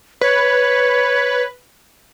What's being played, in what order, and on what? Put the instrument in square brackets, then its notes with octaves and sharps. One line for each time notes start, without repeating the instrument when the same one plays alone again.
[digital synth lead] B4 [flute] C#5